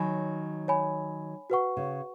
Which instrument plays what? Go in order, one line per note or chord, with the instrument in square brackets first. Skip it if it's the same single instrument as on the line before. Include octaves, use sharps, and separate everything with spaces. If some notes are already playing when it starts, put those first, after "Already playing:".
Already playing: [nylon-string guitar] D#3 F#3 [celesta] C#5 G#5 B5
[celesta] C#5 G#5 B5
F#4 B4 F#5 C#6
[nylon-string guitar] C#3